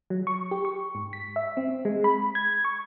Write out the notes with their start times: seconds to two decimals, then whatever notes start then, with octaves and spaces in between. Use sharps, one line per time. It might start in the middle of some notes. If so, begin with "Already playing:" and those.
0.10 F#3
0.27 C#6
0.51 G4
0.65 C#6
0.95 G#2
1.13 B6
1.36 E5
1.57 C4
1.85 G#3
2.04 B5
2.35 G#6
2.65 C#6